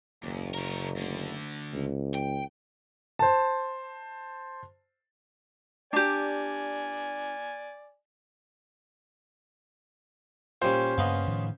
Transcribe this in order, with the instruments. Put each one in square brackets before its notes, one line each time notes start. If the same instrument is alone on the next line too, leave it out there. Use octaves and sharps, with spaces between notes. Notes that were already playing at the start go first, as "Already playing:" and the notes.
[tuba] F#1 [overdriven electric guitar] D#2
[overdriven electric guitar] C#3 A#4
D2 D3
[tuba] C#2
[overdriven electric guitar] G5
[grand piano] C5 A5
[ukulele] D4 G4 [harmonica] D5 G#5
[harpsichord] A#2 G3 [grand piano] C#4 C5
[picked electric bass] G2 A#3 [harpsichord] C#3 B3 D#5
[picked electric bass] A2 D#3 F3